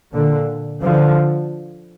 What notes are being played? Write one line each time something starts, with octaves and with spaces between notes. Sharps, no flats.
A#2 D3
D3 F3